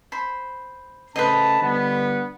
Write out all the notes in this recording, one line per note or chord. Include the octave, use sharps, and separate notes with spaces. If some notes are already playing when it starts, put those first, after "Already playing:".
C5 B5
C#3 A3 B4 C5 D#5 A5
D3 G3 B3